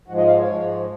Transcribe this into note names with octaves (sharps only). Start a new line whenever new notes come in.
G#2 F3 G#3 F#4
D#5
F5
C#5
G#2 F3 G#3